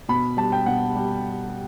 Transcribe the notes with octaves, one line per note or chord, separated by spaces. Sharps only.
B2 B5
G3 A5
G5
B2 F#5
G3